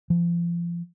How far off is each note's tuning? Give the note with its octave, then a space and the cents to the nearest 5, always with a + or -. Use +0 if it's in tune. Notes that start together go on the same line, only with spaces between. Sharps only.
F3 -30